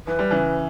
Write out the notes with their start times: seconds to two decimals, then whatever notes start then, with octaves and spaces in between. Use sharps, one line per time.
0.07 E3 B4
0.19 G3
0.31 C#3 E3